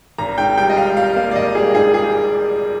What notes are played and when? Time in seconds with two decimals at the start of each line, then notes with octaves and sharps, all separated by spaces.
0.18 G#1 A#5
0.38 G#2 G5
0.58 G3 G5
0.70 D#5
0.77 G3 F5
0.97 G3 F5
1.16 A#3 F5
1.31 D5
1.36 G#1 D#5
1.55 G3 G#4
1.75 G#2 G#4
1.94 G#4